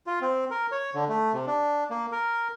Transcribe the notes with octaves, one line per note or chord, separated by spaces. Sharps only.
F4
C4
A#4
C#5
D3
A3
C3
D4
A#3
A#4